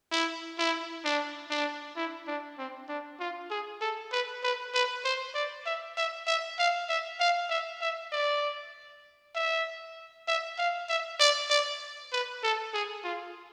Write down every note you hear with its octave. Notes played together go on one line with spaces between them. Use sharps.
E4
E4
D4
D4
E4
D4
C4
D4
F4
G#4
A4
B4
B4
B4
C5
D5
E5
E5
E5
F5
E5
F5
E5
E5
D5
E5
E5
F5
E5
D5
D5
B4
A4
G#4
F4